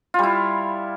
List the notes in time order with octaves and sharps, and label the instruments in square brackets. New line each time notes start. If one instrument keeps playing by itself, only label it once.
[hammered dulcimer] F4
G3
E4